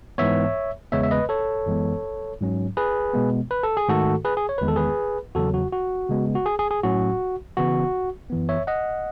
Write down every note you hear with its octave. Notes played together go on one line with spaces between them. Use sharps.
G#2 E3 B3 C#5 E5
E2 C#3 G#3 B3 C#5 E5
E5
B4 D#5
A4 C#5
F#2 E3 G#3 B3
G#2 F#3 C#4
G#4 B4
B2 G#3 B3
B4
A4
G#4
G#2 D#3 A3 F#4 A4
G#4 B4
G#4
C#5
E2 D#3 G#3 B3 B4
A4
G#4 B4
E2 C#3 F#3 F#4 A4
F#4
F#4
C#3 G#3 B3
F#4
G#4
G#4
G#4
A2 F#3 C#4 F#4
C#3 E3 B3 F#4
F#2 E3 B3
C#5 E5
D#5 F#5